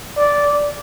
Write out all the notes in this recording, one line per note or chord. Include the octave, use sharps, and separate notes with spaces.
D5